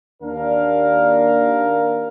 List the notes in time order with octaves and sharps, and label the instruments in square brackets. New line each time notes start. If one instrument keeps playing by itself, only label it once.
[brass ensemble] D#2 D4 A#4 F5